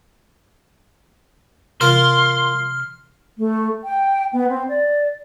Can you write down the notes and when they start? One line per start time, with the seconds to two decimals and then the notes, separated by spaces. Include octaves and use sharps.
1.81 C3 E3 F4 A#4 C6 F6
3.38 A3
3.84 G5
4.33 B3
4.49 C4
4.69 D5